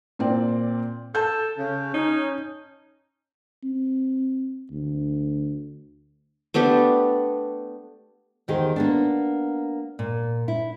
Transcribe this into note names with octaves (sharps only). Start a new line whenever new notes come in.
A#2 C4 D5
A4 A5 G6
C#3
C#4 D#4
C4
D2
A3 B3 D4 G4
E2 D#3 G4 G#4 C5
A#3 B3 D4
A#2
E4